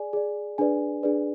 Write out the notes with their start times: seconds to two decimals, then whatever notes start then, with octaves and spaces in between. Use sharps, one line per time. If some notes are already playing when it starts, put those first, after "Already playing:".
Already playing: G#4 D5 G#5
0.13 G#4 D5
0.58 D4 G#4 B4 D5 G#5
1.03 D4 G#4 B4 D5